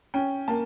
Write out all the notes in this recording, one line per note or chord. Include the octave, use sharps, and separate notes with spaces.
C#4 G5
A#3 A5